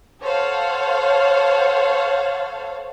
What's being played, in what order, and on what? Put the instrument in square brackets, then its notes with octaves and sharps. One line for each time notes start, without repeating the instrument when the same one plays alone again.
[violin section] A4 C5 C#5 F5 F#5